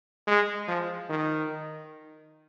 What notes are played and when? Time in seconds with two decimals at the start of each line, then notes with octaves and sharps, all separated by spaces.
0.28 G#3
0.68 F3
1.09 D#3